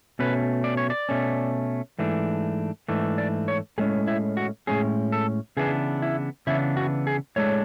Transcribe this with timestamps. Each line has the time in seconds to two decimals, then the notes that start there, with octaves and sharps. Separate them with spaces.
0.19 B2 A3 C#4 B4
0.64 D5
0.77 C#5
0.90 D5
1.09 B2 A3 C#4
1.99 G#2 E3 A3 D4
2.88 G#2 E3 A3 D4
3.18 D5
3.48 C#5
3.78 A2 G#3 C#4 G#4
4.07 E4
4.37 F#4
4.67 A2 G#3 C#4 G#4
5.12 A4
5.57 C#3 E3 B3 D4 G#4
6.02 E4
6.47 C#3 E3 B3 D4 E4
6.77 F#4
7.07 G#4
7.36 A2 G#3 D4 C#5